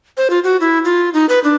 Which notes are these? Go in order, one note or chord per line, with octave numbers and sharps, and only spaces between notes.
C5
F4
F#4
E4
F4
D#4
B4
D4